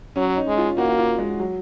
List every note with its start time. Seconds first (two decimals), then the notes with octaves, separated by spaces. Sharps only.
0.16 F#3 C#4
0.37 D#4
0.48 G#3
0.58 F4
0.78 A#3 F#4
0.89 F#4
0.98 F4
1.18 G#3
1.40 F#3